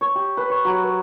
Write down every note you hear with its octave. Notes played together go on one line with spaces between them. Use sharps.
C#5
G4
B4
C#5
F#3
B4